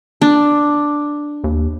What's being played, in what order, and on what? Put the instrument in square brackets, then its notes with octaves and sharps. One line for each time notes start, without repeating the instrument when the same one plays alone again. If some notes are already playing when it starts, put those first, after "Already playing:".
[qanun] D4
[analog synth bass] D#2